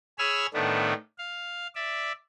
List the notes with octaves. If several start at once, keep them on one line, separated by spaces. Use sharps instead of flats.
G#4 C#5 G#5 B5 E6 F6
A2 D#3 A3 B3 D4
F5
D5 E5